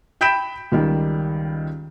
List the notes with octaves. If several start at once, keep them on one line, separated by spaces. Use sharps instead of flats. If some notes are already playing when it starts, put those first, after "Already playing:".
G5 B5 G6 B6 D7 E7
C#2 D#3 G3